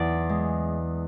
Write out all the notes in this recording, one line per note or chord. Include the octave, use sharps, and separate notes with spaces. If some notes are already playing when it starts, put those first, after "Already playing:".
Already playing: E2 D5
G#3